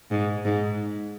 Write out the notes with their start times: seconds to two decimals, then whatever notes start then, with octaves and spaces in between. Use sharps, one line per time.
0.11 G#2
0.45 G#2